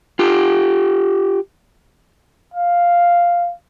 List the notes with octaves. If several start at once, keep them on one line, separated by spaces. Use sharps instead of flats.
F4 G4
F5